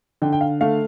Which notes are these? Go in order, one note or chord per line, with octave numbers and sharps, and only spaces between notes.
D3 G5
G5
F5
A3 F5